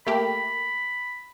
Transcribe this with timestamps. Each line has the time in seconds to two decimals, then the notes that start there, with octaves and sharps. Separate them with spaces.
0.07 A3 A#3 G4 B5